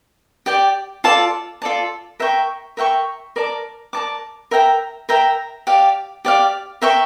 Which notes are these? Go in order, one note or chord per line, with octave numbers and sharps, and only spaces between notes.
G4 D5 G5
F4 A4 D5 A5
F4 A4 D5 A5
A#4 E5 G5 C#6
A#4 E5 G5 C#6
A#4 D5 A5 D6
A#4 D5 A5 D6
A#4 E5 G5 A#5
A#4 E5 G5 A#5
G4 D5 F5
G4 D5 F5
A#4 E5 G5 C#6